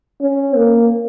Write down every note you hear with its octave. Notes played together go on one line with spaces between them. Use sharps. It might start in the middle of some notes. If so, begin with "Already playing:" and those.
C#4
A#3